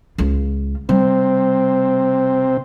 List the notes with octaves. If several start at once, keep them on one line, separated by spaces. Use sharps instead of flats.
C#2 F4
C3 G3 C4